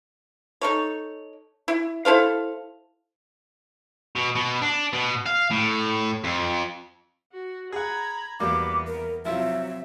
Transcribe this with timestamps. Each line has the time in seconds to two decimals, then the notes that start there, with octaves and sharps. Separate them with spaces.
0.61 D#4 A4 C#5
1.68 E4
2.05 E4 A4 C5 F5
4.15 B2
4.35 B2
4.62 D4
4.93 B2
5.26 F5
5.51 A2
6.24 F2
7.32 F#4
7.72 G#4 F#5 A#5 B5 G#6
8.40 E2 G3 A#3 B3 F#4 D6
8.87 A#4
9.25 C3 F3 F#3 E4 F4 E5